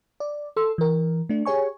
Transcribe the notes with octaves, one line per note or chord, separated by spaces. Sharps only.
D5
A4 C6 E6
E3 A#4
A3 D4
G4 G#4 C#5 G#5 C#6